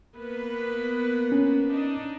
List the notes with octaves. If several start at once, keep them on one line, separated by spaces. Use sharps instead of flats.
A#3 B3 B4
C#4
D4 D#4